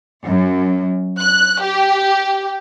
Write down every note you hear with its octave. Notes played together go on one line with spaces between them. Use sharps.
F#2
F#6
G4